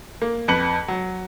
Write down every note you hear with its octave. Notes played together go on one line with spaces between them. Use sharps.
A#3
F2 B4 C#7 F#7
F#3